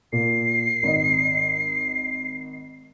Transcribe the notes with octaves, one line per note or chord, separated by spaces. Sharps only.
A#2 C7
G#1 D#5